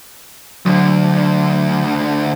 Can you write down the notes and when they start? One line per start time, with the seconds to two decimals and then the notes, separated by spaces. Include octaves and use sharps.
0.66 D2 D3 F#3